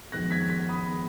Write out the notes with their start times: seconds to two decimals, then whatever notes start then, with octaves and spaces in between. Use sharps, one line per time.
0.12 F2 D#3 G#3 B3 F#6 A#6
0.31 G#6 B6
0.50 G#6 B6
0.69 B5 D#6
0.88 D#3 G#3 B3